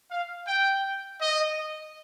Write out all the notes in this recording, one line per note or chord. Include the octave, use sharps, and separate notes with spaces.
F5
G5
D#5